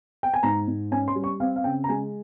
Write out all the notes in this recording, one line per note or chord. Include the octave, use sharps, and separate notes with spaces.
G5
G#5
G#2 A#5
G#2
C#4 G#5
C6
G3
C#6
C4 F5
F5
C#3 G5
A#5
G#3 G#5